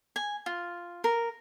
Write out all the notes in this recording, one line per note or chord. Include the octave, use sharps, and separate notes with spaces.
G#5
F4
A#4